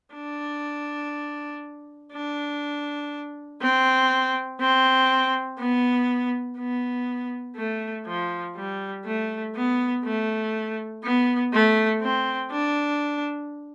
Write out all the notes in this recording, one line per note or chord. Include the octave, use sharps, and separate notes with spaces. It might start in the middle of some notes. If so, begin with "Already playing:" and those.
D4
D4
C4
C4
B3
B3
A3
F3
G3
A3
B3
A3
B3
A3
C4
D4